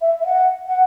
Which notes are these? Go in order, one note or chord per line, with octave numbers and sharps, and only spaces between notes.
E5
E5
F#5
F#5